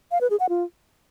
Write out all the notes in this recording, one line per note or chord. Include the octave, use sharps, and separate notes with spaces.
F5
B4
G#4
F#5
F4